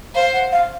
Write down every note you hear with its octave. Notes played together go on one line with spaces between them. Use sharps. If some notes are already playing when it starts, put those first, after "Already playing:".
C5 F5
F#5
F5